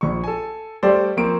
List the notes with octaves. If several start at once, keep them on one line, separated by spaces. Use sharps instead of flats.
A#1 C#6
A4 G#5
G3 A3 G4 A4 C5 D5
F3 A#3 C4 C#6 D7